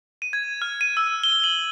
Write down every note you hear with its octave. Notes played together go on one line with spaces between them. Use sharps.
D#7
G#6
F6
D#7
E6
G7
F#7